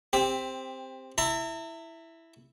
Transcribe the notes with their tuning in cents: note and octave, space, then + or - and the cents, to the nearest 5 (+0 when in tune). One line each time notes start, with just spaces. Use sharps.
C4 +0 G4 +20
E4 +0 A#5 -45